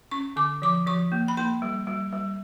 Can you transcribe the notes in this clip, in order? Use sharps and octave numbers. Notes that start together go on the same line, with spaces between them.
C#4 C#6
D3 D6
F3 D6
F3 C#6
A#3
B5
A#3 C6
G3
G3
G3